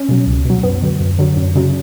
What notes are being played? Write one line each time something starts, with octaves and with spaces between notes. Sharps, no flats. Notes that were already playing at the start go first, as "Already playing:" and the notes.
Already playing: C#4
B2 F#3
C#2
B2 F#3
F#2 B3
D3 F#3
F#2
D3 F#3
F#2
C#3 F#3